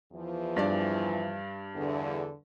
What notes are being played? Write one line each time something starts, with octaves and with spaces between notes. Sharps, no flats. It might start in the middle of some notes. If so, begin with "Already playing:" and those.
E2 E3 F3
G2 D4 D5
E2 D3